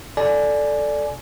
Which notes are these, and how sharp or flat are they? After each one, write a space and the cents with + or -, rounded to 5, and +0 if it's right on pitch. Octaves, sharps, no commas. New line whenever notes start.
A4 +0 D5 +0 G#5 +20